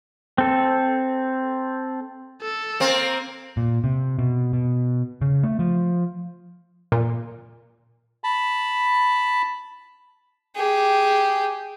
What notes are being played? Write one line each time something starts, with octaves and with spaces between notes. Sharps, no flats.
C4 A4
A4
A#3 C4
A#2
C3
B2
B2
C#3
A3
F3
A#2
A5 B5
G4 G#4